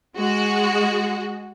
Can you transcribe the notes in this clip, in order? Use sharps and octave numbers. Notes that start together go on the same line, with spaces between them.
G#3 F#4